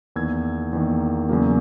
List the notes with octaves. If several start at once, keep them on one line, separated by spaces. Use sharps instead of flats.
E2 D#3 A#3 E6 G#6
E2 D#3 A#3
E2 C#3 F#3 A#3